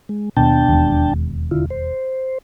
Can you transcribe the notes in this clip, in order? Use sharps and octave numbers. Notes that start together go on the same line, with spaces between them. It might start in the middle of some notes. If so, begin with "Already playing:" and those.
G#3
D#2 B2 D4 G5 A5
E1 D#2
D3 E4 F4
C5